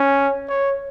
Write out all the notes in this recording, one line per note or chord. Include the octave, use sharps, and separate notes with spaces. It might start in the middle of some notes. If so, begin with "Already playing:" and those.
Already playing: C#4
C#5